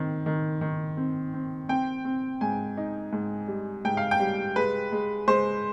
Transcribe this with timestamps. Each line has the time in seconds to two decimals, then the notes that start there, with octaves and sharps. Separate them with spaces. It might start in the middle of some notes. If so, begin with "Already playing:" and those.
Already playing: D#3 C4
0.26 D#3
0.61 D#3
0.97 C4
1.34 C4
1.69 C4 G5
2.05 C4
2.41 G#2 G#5
2.77 D#4
3.13 G#2
3.48 G3
3.85 G#2 G5
3.97 F5
4.11 G5
4.20 G3
4.56 G#3 B4
4.92 G#3
5.28 G#3 C5